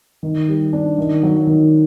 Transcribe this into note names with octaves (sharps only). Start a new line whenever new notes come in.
D#3
G3
D4
D#3
F#3
D#3